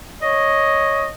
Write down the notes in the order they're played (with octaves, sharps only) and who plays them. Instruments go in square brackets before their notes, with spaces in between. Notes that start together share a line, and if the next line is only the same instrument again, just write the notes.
[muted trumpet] C#5 [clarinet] D#5